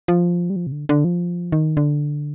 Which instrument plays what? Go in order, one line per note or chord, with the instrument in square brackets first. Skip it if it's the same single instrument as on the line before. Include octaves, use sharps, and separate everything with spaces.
[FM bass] F3
G3
F3
C3
D3
D3
F3
D#3
D3